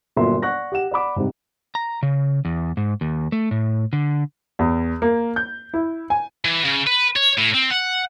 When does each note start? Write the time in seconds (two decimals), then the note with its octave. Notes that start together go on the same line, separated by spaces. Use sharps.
0.17 G1 A#2 F#3 A#4 E5 C6
0.42 D5 F#5 C#6 F#6 A#6
0.72 G4 F#5 E7
0.91 D5 F#5 B5 D6
1.16 G#2 C3 G3
1.75 A#5
2.03 C#3
2.45 E2
2.77 G#2
3.01 D#2
3.32 A3
3.51 A2
3.93 D3
4.59 E2
5.02 A#3
5.36 G6
5.74 E4
6.10 G#5
6.45 E3
6.65 C#3
6.87 B4
7.16 C#5
7.38 A2
7.54 C4
7.71 F#5